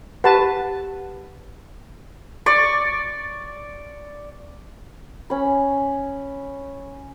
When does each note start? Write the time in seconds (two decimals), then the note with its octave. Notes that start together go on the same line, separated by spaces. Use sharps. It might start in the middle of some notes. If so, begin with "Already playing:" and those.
0.24 G4 B4 F#5 A5
2.46 D5 C#6
5.30 C#4 B5